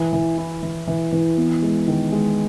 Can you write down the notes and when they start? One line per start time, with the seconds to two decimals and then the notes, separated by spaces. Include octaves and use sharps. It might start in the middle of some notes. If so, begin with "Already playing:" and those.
Already playing: E3
0.13 E3
0.38 E4
0.63 E3
0.87 E3
1.12 E3
1.37 B3
1.62 G#3
1.88 D#3
2.12 G#3